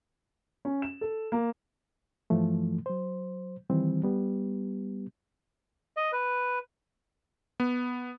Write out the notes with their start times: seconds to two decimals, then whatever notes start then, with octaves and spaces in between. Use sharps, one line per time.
0.65 C#4
0.82 E7
1.01 A4
1.32 A#3
2.30 G2 E3 F3 A3
2.86 F#3 C5
3.70 D#3 E3 G3 C4
4.03 G3 B3 G4
5.97 D#5
6.12 B4
7.60 B3